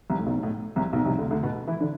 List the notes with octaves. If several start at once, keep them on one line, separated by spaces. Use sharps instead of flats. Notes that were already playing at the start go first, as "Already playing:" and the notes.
C2 C3
A2
B1 B2
A2
C2 C3
B1 B2
C2 C3
D2 D3
D2 D3
B2 B3
E3 E4
D3 D4